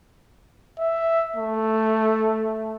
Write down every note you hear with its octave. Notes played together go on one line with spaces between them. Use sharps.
E5
A3